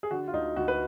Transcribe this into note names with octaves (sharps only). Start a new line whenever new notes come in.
G#4
D3 F#4
F4
D2 D#4
D2 F#4
B4